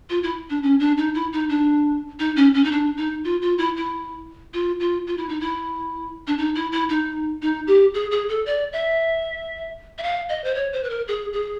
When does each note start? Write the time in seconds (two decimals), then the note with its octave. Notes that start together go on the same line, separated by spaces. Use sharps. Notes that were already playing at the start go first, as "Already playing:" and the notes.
0.10 F4
0.23 E4
0.50 D4
0.63 C#4
0.80 D4
0.98 D#4
1.15 E4
1.33 D#4
1.49 D4
2.19 D#4
2.36 C#4
2.54 C#4
2.64 D#4
2.71 D4
2.97 D#4
3.24 F4
3.42 F4
3.58 E4
3.77 E4
4.54 F4
4.80 F4
5.07 F4
5.17 E4
5.29 D#4
5.40 E4
6.27 D4
6.38 D#4
6.55 E4
6.72 E4
6.89 D#4
7.42 D#4
7.67 G4
7.94 G#4
8.11 G#4
8.29 A4
8.46 D5
8.73 E5
9.98 E5
10.03 F5
10.29 D#5
10.44 C5
10.55 C#5
10.73 C5
10.84 B4
10.90 A#4
11.08 G#4
11.33 G#4